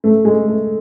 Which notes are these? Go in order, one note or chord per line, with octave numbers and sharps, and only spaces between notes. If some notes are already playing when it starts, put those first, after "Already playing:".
A3
G#3
A3